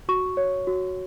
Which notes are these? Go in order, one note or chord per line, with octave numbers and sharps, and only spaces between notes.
F#4 C#6
C#5
F#4